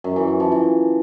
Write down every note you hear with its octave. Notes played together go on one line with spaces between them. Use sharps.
F#2
E3
F#2
F3
E3